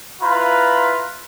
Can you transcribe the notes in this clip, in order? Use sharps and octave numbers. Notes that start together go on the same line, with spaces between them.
E4 F4 B4 A#5 B5